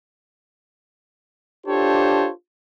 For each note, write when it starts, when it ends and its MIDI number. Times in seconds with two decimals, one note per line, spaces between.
1.66 2.28 62
1.66 2.28 65
1.66 2.28 67
1.66 2.28 69
1.66 2.28 72
1.66 2.28 73